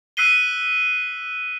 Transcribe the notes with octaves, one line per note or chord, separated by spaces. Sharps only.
E6 F#6 B6 C7 D#7 G7